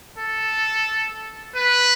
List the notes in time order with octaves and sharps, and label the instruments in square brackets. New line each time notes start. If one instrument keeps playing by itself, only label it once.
[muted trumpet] A4
B4